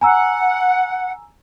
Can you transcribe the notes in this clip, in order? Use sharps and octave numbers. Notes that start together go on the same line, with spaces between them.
F#5 G#5 A#5 E6